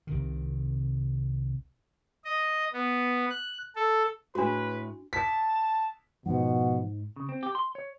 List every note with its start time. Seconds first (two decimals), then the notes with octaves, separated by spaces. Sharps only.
0.07 C2 C3 D#3
2.25 D#5
2.73 B3
3.30 F#6
3.75 A4
4.35 A2 G#3 D4 F#4 B4
5.13 A5 B6
6.26 G#2 B2 F3 F#5
7.16 C#3
7.29 C4
7.43 G4
7.55 C6
7.75 C#5